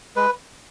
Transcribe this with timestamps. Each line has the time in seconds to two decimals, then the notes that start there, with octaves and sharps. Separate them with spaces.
0.16 G#3 B4